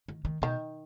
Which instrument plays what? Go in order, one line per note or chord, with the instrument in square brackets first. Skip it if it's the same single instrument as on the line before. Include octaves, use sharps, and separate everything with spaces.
[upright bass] D#3
D#3
[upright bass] B2 [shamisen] D#3